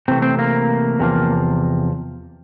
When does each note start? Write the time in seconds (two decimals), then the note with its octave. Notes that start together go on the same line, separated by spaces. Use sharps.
0.08 C3 E3 A3 C4
0.22 C4
0.39 A#3
0.99 E2 C3 F3 A#3